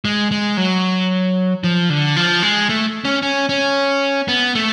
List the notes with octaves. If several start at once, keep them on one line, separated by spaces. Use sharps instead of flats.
G#3
G#3
F#3
F3
D3
F3
G#3
A3
C#4
C#4
C#4
B3
A3